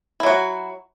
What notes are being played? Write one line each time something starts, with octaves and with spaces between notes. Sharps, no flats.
F#3 E4 F#4